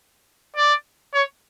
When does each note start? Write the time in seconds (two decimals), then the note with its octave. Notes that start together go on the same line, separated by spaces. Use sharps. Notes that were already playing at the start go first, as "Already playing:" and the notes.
0.56 D5
1.14 C#5